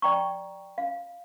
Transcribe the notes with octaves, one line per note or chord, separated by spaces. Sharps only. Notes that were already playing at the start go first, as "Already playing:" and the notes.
D5 G5 A#5 C#6
F5